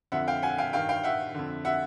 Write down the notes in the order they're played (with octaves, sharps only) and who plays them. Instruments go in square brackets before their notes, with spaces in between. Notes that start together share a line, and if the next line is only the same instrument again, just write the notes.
[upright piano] F2 D3 E5 F#5
F5 G5
F#5 G#5
F5 G5
G2 D#3 F5 G5
F5 G5
E5 F#5
F2 D3
E5 F#5